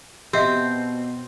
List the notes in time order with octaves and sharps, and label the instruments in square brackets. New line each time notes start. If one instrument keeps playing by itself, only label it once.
[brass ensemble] B2 [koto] C4 [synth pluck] G4 D#5 E5